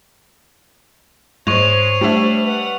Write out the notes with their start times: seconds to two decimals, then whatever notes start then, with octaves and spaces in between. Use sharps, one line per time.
1.47 G#2 G#3 C5 C#5 C#6 F7
2.01 G3 A3 D4 E5
2.44 B4 F#5